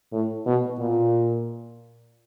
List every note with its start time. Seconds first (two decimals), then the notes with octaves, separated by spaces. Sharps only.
0.13 A2
0.46 B2
0.79 A#2